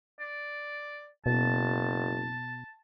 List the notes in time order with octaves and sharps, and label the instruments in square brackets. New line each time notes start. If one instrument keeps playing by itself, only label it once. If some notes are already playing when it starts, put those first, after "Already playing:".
[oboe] D5
[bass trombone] F#1 [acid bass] B2 [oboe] A5